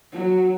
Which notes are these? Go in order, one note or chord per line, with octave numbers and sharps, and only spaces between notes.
F#3